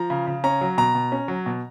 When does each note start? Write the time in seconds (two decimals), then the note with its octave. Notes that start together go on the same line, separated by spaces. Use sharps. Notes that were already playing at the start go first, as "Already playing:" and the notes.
Already playing: F3 A#5
0.10 C#3
0.27 C#3
0.44 C#4 A#5
0.61 F#3
0.78 B2 A#5
0.95 B2
1.12 C#4
1.28 F#3
1.46 B2